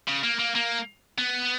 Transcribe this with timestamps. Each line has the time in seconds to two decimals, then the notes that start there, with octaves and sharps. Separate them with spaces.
0.08 C#3
0.24 A#3
0.39 A#3
0.55 A#3
1.18 B3